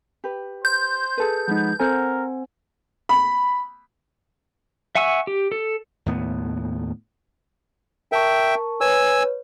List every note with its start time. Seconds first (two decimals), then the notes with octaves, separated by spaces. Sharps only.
0.24 G4 B4
0.65 C5 G6
1.17 G#4 A4 B4
1.48 F3 G#3 B3 D#4
1.80 C4 A4 A#4 C5 F#5 G#5
3.09 B5
4.95 E5 F#5 G#5 C#6 E6
5.27 G4
5.52 A4
6.06 D#2 A2 B3
8.12 A#4 E5 G5 A5 C#6
8.81 B4 C#5 G#5 E6